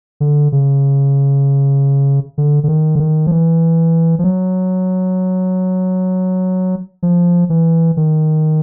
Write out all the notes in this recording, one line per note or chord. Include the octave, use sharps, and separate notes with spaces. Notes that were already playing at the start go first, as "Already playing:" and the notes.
D3
C#3
D3
D3
D#3
D3
D#3
F3
E3
F3
F#3
F3
E3
D#3